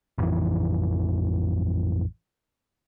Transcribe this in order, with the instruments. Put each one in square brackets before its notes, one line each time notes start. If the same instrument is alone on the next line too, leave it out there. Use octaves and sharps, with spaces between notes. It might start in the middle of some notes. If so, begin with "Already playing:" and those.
[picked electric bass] A1 F2 E3